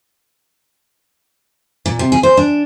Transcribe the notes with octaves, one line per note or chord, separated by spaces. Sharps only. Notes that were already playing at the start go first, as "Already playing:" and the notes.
A#2
C3
G#4
C5
D4